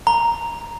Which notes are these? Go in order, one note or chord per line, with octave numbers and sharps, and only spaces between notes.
A#5